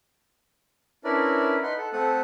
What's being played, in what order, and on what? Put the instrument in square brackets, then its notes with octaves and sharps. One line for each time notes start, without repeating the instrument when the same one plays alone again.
[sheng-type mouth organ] C#4 D4 E4 A#4 B4 D5
D#4 B4 F#5 C6
A4 F#5
A3 C4 A4 F#5 D#6